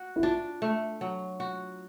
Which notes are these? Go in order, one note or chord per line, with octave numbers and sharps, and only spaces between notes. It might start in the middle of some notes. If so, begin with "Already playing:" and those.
Already playing: F#4
E4
D4 F4
A3
F#3
F#4